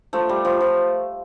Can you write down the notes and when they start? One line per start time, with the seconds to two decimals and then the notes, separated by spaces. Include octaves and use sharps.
0.13 F3 A3
0.29 G3
0.45 F3
0.61 F3